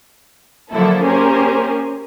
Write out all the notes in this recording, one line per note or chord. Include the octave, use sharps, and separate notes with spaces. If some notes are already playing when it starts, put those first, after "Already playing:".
D3 F3 F#3 A#3 E4 A4
A#3 C#4 G4 G#4 A#4 C5